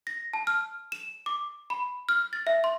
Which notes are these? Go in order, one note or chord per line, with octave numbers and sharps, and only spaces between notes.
A#6
A5
F6
E7
D6
B5
F6
A6
E5
C6